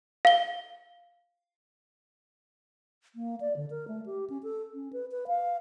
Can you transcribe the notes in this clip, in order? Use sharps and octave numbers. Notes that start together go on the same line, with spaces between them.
F5 G7
A#3
D5
D3
A#4
A3
G4
C#4
A4
C#4
B4
B4
F5